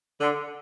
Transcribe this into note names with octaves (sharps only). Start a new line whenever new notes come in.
D3